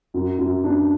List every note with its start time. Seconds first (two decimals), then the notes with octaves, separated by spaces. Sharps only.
0.14 F#2
0.39 F#2
0.64 D4